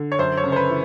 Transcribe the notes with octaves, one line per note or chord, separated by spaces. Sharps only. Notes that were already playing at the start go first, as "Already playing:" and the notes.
Already playing: D3
C#5
F#2 C5
C#5
C#3
C5
B4
E3